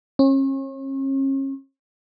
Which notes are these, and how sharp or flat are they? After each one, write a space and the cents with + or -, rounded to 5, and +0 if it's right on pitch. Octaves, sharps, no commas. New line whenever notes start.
C#4 -40